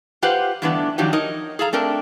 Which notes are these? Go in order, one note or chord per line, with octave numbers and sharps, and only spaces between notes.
F4 G4 B4 C5 F5 F#5
G2 D3 E3 A3 B3 D4
D#3 F3 F#3 D4 D#4 G4
D#4 A#4 C#5 D#5
G#4 A4 F5 A#5
A3 C4 D4 A#4